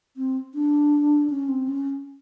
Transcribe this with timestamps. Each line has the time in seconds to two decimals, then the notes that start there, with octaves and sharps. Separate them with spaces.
0.17 C4
0.54 D4
1.30 C#4
1.48 C4
1.69 C#4